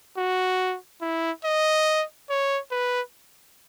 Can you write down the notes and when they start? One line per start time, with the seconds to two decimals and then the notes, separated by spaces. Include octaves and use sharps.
0.17 F#4
1.02 E4
1.45 D#5
2.30 C#5
2.71 B4